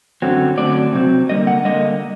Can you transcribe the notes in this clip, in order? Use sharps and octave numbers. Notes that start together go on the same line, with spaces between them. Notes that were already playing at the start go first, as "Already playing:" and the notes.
F#2 D3 F#3 C4
D3 F#3 A3 C4 D5
C3 F#3 C4
D3 G3 A#3 D#5
F#5
D3 G3 A#3 D#5